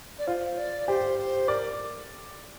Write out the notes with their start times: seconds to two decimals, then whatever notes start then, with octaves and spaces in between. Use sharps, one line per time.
0.19 D5
0.27 F4 C5
0.58 D5
0.87 G4 C5
1.19 C5
1.48 A#4 D5